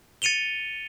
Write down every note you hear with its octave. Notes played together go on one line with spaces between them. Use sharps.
A6 C#7 D#7 F7 G7